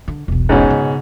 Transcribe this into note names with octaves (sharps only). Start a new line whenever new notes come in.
D3
E1 B1
G#2 B2 C#4
C#3